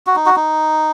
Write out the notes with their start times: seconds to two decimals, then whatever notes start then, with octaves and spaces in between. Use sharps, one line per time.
0.07 F#4
0.16 D#4
0.26 F#4
0.36 D#4